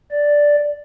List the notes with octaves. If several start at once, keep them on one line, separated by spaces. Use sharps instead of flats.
D5